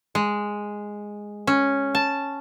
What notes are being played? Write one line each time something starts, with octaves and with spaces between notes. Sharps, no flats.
G#3
C#4
A5